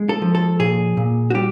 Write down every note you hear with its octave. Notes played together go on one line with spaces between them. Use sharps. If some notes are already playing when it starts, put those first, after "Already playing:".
Already playing: G#3
A4
F3
A4
A#2 G#4
A#2
F#4
G3 G4